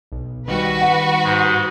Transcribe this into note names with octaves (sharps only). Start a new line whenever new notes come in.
B1
D#3 G3 F#4 B4
F#5
G#2